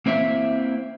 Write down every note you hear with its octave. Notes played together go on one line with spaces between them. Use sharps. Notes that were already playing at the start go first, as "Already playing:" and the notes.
A#3 C4 E4 E5